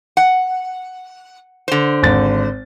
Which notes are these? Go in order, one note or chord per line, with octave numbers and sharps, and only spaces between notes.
F#5
D3 C5
G#1 A6